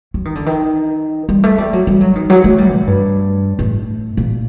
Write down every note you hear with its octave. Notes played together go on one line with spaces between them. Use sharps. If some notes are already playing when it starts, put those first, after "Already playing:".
F#3
D#3
D3
D#3
G3
A3
G3
F#3
G3
F#3
D#3
F#3
A3
G3
A#2
G2
A2
A#2